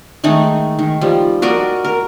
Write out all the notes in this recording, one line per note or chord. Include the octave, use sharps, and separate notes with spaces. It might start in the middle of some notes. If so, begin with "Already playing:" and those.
D#3 G#3 A3 D#4
D#3
F3 G3
F#4 A#4 D5 D#5
A#4